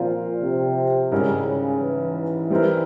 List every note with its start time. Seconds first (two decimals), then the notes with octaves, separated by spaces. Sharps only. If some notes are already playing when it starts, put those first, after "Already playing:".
Already playing: A#2 F3 C4 F4 A#4
0.42 C3
1.11 G#2 C#3 G3 C#4 E4 A#4
1.82 E3
2.50 G3 C4 E4 A#4